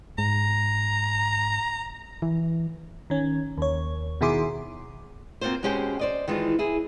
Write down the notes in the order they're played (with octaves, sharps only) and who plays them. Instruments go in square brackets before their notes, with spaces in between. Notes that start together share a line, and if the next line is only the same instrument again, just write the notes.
[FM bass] G#2 [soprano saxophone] A#5
[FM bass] E3
[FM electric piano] D#3 C#4
D#2 C#5
B2 D#3 E4 G#4 C6 D6
[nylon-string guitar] A#3 C4 C#4 F4 F#4 C5
B2 G#3 C#4 G4 C5 G5
C5 D5 D#5
D#3 E3 G#3 F4
E4 G#4